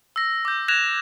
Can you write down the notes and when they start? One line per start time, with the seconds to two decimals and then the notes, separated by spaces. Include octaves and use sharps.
0.16 E6 A#6
0.45 D6 G6
0.68 F#6 G#6 A#6 E7 F7